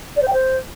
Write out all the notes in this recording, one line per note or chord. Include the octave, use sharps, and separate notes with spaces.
D5
C5
G5
C5